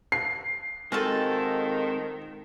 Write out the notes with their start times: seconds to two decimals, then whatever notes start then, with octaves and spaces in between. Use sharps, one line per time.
0.12 C7
0.92 D#3 G#3 C4 F4 F#4 A4